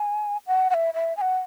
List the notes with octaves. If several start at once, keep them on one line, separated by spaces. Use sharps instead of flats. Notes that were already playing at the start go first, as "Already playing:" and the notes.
Already playing: G#5
F#5
F#5
E5
E5
G#5
F#5